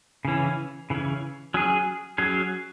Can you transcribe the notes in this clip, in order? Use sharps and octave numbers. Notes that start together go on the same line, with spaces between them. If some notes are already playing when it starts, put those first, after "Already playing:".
C#3 E3 C#4
C#3 E3 C#4
F#3 C#4 G#4
F#3 C#4 G#4